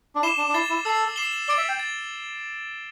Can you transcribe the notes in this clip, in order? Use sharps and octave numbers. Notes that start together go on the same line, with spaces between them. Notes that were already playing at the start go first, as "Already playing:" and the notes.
D4
E4 D6 C7 E7 G7
D4
D4
E4 A6 C7 G7
E4
A4 E6 A6 C7
D6 C7 E7 G7
D5 A6 D7 G7
E5
G5
A6